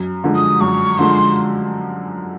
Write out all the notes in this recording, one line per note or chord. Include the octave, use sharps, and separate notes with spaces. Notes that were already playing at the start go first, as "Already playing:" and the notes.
Already playing: F#2
D3 F3 G#3
D#6
F#2 C#6
D3 F3 G#3 C6